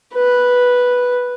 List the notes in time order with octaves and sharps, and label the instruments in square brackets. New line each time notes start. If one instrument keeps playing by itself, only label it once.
[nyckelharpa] B4